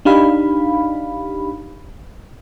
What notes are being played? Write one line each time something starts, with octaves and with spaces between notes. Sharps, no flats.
D4 D#4 G4 F5 B5